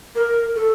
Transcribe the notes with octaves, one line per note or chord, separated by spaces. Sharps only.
A#4
A4